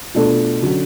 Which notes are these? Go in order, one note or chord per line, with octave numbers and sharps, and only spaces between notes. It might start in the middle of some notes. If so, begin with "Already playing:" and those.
B2 A3 D4 F4 A4
D3 F#3 C#4 F#4